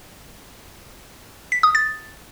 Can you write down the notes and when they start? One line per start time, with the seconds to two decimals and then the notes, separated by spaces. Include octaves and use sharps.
1.52 B6
1.63 D#6
1.75 A6